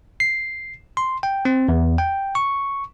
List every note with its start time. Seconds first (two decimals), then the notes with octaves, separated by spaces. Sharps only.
0.20 C7
0.97 C6
1.23 G5
1.45 C4
1.69 E2
1.98 G5
2.35 C#6